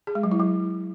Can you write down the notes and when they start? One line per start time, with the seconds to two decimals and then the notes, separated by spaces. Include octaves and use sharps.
0.07 G#4
0.15 G#3
0.23 F#3
0.32 E4
0.40 F#3